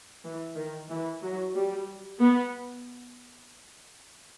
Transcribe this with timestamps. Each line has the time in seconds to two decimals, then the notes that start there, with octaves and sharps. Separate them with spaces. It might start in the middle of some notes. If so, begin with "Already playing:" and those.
0.24 E3
0.56 D#3
0.90 E3
1.22 F#3
1.55 G3
2.20 B3